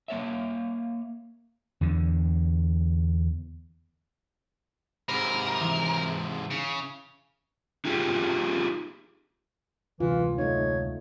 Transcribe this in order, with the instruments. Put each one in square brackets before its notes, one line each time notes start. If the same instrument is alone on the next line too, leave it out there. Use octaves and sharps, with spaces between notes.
[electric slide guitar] A#3 C#5 E5
[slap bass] E2 D3
[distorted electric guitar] G#2 C3 [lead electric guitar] A#4 [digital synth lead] B5
[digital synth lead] E3
[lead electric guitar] C#3
[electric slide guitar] D#4 F4 G4 G#4
[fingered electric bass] D2 C3 [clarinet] E3 [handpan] F4
[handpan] A3 D#4 [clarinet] C#5